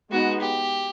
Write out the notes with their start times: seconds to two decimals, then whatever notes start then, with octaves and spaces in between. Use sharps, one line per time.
0.11 G#3 B3 D#4 F#4
0.40 G4